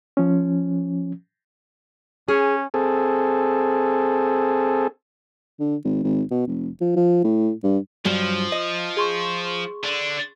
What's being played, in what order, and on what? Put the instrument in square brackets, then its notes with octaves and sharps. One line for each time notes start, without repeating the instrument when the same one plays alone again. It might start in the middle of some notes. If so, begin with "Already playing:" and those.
[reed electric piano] F3 C#4
[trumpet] C#4 [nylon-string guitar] G#4
[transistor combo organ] C4 G#4 A4
[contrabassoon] D3
G#1
G#1
B2
F1
F3
F3
A2
G2
[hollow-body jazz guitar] G2 F#3 [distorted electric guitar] F3
[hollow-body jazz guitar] D#5
[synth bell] G#4 C6 C#6
[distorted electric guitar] D3 D4